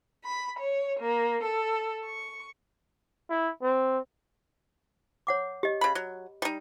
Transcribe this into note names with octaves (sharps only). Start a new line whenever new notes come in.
B5
C#5
A#3
A4
C#6
E4
C4
C#5 F#5 D6
G4 D#5
C#3 B5
F#3
G3 D#4